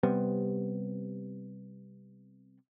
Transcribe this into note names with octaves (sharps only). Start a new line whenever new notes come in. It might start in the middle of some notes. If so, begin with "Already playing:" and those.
C3 G3 B3 C4